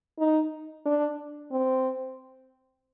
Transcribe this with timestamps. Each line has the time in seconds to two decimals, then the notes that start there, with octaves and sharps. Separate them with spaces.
0.19 D#4
0.86 D4
1.52 C4